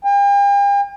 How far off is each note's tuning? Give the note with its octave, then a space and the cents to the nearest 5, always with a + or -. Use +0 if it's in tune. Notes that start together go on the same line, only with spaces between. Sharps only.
G5 +45